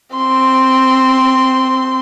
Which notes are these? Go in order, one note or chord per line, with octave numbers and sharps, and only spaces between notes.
C4 C6